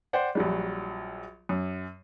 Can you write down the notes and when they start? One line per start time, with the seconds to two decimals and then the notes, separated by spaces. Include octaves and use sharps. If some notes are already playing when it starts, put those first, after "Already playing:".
0.13 C5 D5 F#5 G5
0.35 A#1 F#3 G3
1.49 F#2